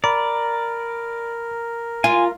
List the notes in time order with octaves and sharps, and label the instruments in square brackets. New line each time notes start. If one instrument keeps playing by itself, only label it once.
[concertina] A#4 [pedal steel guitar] D5 [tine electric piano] A#5 B5
[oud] F4 [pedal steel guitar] G#5